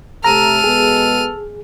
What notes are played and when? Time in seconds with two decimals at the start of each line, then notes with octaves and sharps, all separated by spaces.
0.24 C3 A3 A4 A#5 F6 D#7
0.64 B2 G#3 B3 G#4